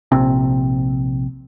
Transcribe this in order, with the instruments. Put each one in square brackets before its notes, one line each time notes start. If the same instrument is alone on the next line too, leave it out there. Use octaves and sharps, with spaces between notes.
[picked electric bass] A#1 C3